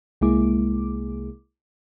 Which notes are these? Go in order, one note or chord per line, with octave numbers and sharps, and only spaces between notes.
C2 G#3 A#3 E4 G#4 D6